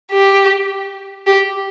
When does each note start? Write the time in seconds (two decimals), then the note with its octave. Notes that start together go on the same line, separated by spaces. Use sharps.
0.12 G4
1.27 G4